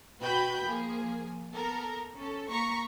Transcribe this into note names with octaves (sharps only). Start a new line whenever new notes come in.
B2 F#4 B4 G5 B5 G6
F3 A#3 G#4
B3 A4 A#4
C#4 A4
A#3 A#5 C#6 B6